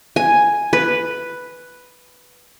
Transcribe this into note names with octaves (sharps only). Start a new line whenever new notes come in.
G#5
B4